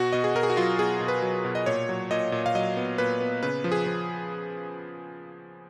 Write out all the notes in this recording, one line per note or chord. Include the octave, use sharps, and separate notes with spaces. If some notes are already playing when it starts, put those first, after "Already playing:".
Already playing: B2 F#4
B2 D#5
G#4
B2 A#4
G#4
F#4
F#3 F4
B2 G#4
B2
B4
F#3
B2
D#5
A#2 C#5
F#3
A#2 D#5
A#2
F5
F#3 D#5
B3
A#2 B4
B3
C#3 B4
F3
G#4
F3